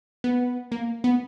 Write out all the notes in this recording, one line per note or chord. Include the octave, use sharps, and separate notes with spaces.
B3
A#3
B3